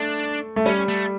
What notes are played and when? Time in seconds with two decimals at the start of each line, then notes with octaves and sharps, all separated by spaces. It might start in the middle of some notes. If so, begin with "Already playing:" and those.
Already playing: A3 D4
0.56 A3
0.66 G3 C#4
0.88 A3